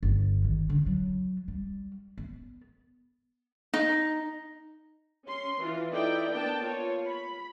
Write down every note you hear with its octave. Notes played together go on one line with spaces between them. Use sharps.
G1
D#3
D3
F#3
G3
B3
D#4
C#4 C6
E3 F4
D#4 E4 A4 D5 G5
A#3 B3 D4 G5 A5
F4 C#5
B5